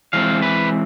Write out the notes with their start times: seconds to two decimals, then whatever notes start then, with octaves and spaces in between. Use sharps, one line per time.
0.13 E3 G#3 C4 F5
0.42 B4